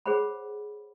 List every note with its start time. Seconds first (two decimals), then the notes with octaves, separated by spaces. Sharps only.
0.06 G#4 C5 C#5 F#5 B5